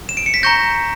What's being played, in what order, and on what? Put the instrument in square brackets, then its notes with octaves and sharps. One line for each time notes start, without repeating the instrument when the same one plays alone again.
[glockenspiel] E7
D7
C#7
B6
A#5 C#6 G6 A#6